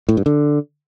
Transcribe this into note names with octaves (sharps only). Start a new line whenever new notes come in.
A2
G2
D3